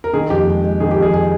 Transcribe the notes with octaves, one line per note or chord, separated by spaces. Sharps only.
A#4
D#3 G#4
F2 G4
G#3
G#3
D#3 G#4
G4
F2
G#4
G#4